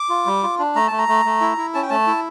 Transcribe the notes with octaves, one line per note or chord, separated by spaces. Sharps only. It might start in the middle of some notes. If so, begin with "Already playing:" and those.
Already playing: D6
F4
G3
F4
D4
A3 A#5
A3 A5
A#5
A3
A3
E4
E4
C#4 A5
G5
A3 A5
E4